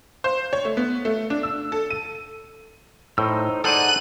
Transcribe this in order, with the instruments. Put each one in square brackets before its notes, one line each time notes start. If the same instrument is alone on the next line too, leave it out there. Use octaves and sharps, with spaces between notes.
[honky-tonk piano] C5
C#5
A3
B3
A3
D4
E6
A4
D#7
[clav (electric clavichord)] A2 [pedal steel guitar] D#4 C5 E6
[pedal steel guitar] D#4 G#4 F#5 [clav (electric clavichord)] A4 C5 D5 [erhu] F#6 [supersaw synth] D#7